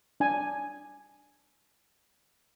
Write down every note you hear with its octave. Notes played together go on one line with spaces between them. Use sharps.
D4 G#5